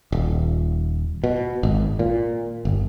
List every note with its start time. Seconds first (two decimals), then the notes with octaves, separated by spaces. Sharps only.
0.12 D#1
1.24 B2
1.63 G#1
1.99 A#2
2.65 G1